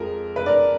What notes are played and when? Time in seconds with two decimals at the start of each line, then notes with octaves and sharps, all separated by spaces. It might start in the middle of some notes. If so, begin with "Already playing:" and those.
Already playing: F2 F3 G#3 A#4
0.36 B4
0.46 A#4 D5